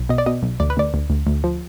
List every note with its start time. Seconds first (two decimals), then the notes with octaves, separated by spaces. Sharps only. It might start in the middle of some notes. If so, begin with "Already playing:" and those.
Already playing: B1
0.09 B2 D#5
0.18 D5
0.26 B2 D#5
0.43 B1
0.60 D2 D5
0.70 B4
0.77 D2 D5
0.94 D2
1.10 D2
1.27 D2
1.44 F3